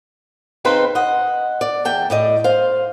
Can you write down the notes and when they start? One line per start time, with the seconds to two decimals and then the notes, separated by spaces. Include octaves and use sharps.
0.65 C#3 C4 D#4 B4 C5 F5
0.95 D#5 F#5
1.61 D5
1.85 E2 G5 A5
2.10 A2 D5 D#5
2.44 C5 F5